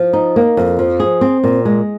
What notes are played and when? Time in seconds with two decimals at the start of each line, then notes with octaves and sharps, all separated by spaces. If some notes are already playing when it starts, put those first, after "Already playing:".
Already playing: F3
0.13 D#4
0.36 A#3
0.57 F2
0.79 F3
1.00 G#4
1.21 C4
1.44 A#2
1.65 G#3